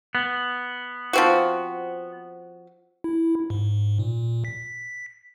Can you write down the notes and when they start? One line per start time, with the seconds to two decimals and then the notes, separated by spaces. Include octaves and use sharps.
0.15 B3
1.13 F3 C4 F#4
3.04 E4
3.50 G#2
3.99 A#2
4.45 B6